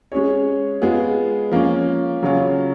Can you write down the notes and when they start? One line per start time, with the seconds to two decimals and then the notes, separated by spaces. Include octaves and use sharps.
0.12 G#3 C#4 G#4 C#5
0.82 G#3 B3 F4 G#4
1.51 F3 A#3 C#4
2.23 C#3 F#3 C#4 F4